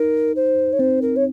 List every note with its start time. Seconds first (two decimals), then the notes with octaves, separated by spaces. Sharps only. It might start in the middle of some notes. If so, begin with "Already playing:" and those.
Already playing: D#4 A#4
0.36 C5
0.73 C#5
0.79 C4 C5
1.02 A#4
1.16 C#5